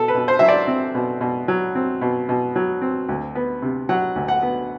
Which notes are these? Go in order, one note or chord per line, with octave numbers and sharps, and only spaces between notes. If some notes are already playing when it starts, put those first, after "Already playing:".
Already playing: B2 A4
B4
B2
C5
F#3 E5
D5
C4
B2
B2
F#3
C4
B2
B2
F#3
C4
D2
B3
C3
F#3 F#5
D2
F#5
B3